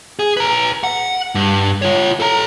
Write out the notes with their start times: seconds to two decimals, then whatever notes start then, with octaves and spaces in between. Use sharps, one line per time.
0.19 G#4
0.37 B4 A#5
0.83 F#5
1.35 G2
1.82 F4 C#5
2.20 A4 A#5